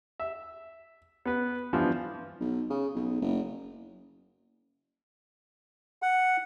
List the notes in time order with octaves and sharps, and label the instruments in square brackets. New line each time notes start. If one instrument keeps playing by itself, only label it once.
[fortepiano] E5
B3 B4
G2 E3 F3 B3
[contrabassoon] B1
C#3
B1
F#1
[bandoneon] F#5